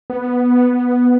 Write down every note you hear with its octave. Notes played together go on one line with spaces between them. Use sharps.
B3